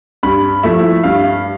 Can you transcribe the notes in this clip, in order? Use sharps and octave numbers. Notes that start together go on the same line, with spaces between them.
G2 B5
F3 A3 E4 E5
G2 F5